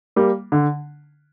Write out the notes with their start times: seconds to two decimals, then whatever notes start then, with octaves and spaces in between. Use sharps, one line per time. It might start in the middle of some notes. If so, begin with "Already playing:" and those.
0.16 G3 A#3
0.52 D3